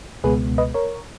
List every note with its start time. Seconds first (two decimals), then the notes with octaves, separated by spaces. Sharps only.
0.24 C#2 B2 G#3 B3 G#4 B4
0.58 B4 D#5
0.74 A#4 C#5